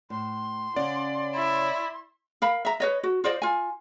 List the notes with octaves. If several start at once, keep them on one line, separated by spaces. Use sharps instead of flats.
A2 C6
C#3 C#4 D5 F#5
E4
A#4 F5 B5
E5 A#5
B4 C#5 D#5
F#4
F4 C5 D5 D#5
F4 G#5